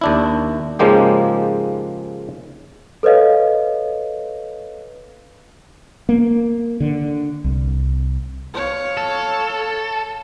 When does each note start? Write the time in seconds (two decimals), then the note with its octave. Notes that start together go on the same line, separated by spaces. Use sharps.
0.01 D#2 D4 E4
0.79 G#2 C#3 F3 G#3 A#3 G4
3.03 A4 B4 C#5 D#5 F5
6.09 A#3
6.80 D3
7.44 C2
8.54 C#5 F5
8.97 A4